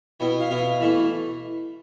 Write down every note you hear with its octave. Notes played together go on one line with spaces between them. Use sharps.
B2 B3 E4 G5
F5
B2 B3 E4 F5
E3 A3 E4 E5